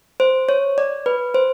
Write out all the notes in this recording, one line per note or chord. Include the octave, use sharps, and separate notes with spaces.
C5
C#5
D5
B4
C5